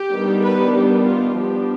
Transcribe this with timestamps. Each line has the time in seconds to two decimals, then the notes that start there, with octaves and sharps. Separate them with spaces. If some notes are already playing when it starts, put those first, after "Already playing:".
Already playing: G4
0.11 D#3 G3 B3 D4
0.43 B4
0.75 G4
1.06 F4
1.38 F3 B3 D4 G4